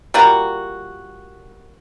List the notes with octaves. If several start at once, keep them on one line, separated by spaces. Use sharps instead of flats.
G3 A#3 F4 F#4